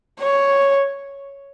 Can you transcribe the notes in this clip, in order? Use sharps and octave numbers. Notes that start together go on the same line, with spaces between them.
C#5